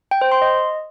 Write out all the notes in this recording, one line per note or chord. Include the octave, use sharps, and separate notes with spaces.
G5
C5
C6
D#5